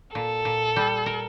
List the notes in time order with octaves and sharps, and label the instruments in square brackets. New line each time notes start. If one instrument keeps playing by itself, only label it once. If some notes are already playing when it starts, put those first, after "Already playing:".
[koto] A#2 [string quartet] A4
[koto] A#2
G3
A#4